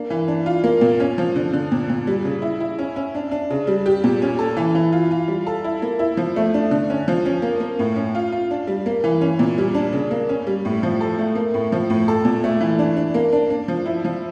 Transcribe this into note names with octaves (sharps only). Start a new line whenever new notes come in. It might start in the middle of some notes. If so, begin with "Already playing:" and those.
Already playing: A#3 D4
E3
D4
F4
A#3
A#2
C#4
F3
D3
D3
A#2
A#2
G3
C#3
E4
E4
C#4
C#4
D4
D4
C#3
G3
G4
A#2
C#4
A4
E3
E3
F4
F4
G3
A4
E4
A#3
E4
F3
A3
D4
D3
C#4
F3
C#4
A#3
A#3
A2
C#4
F4
F4
D4
G3
A#3
E3
C#4
A#2
G3
D4
C#3
A#3
C#4
G3
A2
F3
A4
A3
A#3
A2
F3
A2
A4
A#2
A3
E3
D4
D4
A#3
D4
D4
F3
E4
F3